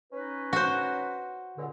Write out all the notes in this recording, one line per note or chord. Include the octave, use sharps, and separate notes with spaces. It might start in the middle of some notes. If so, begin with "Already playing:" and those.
C#4 D#4 B4
F#4 C5
C#2 A#2 D3